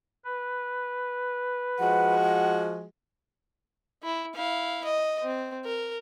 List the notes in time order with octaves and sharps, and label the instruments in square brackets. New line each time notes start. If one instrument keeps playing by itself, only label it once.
[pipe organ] B4
[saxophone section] F3 G#3 F#4 [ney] F#5
[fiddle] E4
E4 F5
D#5
C4
A#4